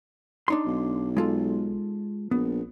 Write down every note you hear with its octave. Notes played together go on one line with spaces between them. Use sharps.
D4 D#4 C6
B1
G#3 F4 A4
A#1 B3